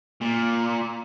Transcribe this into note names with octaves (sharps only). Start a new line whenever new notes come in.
A#2